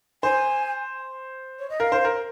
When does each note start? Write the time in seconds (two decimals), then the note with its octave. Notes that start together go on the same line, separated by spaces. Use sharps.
0.23 C5 G#5
1.59 C#5
1.70 D#5
1.80 A#4 F5
1.92 C5
2.04 A#4